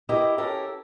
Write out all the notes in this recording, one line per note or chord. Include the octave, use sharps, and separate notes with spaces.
E4 G4 A#4 D#5 E5
C#4 G4 A4 A#4